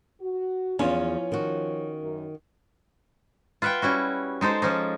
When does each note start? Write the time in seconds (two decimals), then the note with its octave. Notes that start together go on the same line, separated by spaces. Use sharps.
0.21 F#4
0.79 E2 F3 C#4 F4 C#5
1.32 D#3 F#4
2.02 F#2
3.62 F4 B4 E5 F#5 G5
3.82 G3 C#4 E4 F#4
4.41 G#3 D#4 A4 C5
4.62 F3 C#4 D#4